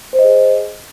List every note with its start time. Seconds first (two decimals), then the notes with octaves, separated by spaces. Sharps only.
0.13 C5
0.19 D#5
0.24 G#4